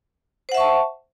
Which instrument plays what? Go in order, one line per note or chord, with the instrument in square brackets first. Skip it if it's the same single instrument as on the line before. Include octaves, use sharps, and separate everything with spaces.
[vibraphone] C5
F#5
E5
C#6
A5